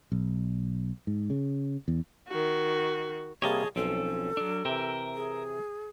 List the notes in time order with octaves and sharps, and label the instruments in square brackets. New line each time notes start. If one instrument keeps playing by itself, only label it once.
[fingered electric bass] B1
G#2
C#3
E2
[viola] D#3 F#4
[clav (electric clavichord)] C3 G3 A#3 [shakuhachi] G#4 [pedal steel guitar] C#5 D#5 A5
[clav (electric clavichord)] B1 [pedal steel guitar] F3 C4 C#4 [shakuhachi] A4
[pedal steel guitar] F#3 D4
[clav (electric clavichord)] C3 E3 [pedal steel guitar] A#4 E5 G5
[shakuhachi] G#4